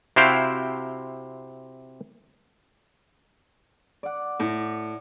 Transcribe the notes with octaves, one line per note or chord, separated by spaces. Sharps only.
C3 E4 F#4 C5 F5 G5
D5 F#5
A2